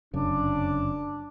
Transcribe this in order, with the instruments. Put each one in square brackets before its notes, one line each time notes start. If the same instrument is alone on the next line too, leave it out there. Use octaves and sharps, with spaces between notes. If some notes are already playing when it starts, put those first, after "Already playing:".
[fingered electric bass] F1 F#2 C#3 [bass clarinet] D4